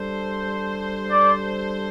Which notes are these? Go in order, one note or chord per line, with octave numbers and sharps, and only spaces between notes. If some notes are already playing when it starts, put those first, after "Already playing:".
Already playing: G3 D4 A4 C5
D5